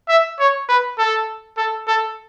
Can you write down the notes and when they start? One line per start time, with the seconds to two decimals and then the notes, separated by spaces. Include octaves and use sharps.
0.09 E5
0.39 C#5
0.69 B4
0.98 A4
1.57 A4
1.87 A4